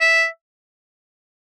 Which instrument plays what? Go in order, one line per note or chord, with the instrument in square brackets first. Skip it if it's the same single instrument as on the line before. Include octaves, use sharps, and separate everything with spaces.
[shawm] E5